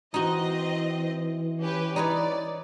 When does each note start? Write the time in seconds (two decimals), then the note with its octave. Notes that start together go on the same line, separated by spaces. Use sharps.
0.14 E3 C4 D#4 F#4 D#5
1.59 C#4 G4 B4
1.96 D#4 B4 C#5 D5